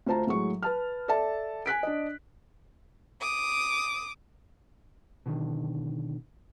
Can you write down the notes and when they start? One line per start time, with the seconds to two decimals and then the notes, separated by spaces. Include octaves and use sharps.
0.06 D2 F4 C5 A5 A#5
0.27 A2 F#3 G#3 C#6
0.63 B4 A5 F6
1.08 A4 D5 E5 A5
1.66 G#5 F#6 B6 D7
1.83 D4 D#5
3.21 D6 D#6
5.26 B2 D3 D#3